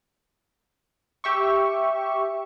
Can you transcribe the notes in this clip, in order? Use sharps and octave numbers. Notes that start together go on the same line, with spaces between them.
G4 E5 C#6